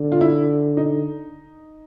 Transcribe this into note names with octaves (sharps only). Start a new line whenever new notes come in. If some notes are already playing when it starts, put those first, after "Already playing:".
Already playing: D3
F4
E4
D#4